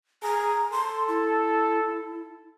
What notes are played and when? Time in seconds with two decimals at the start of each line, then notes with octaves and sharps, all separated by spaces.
0.23 G#4 A#5
0.72 A4 C6
1.08 E4